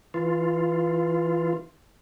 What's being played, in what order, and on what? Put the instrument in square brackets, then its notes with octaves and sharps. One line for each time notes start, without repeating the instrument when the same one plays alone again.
[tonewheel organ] E3 F4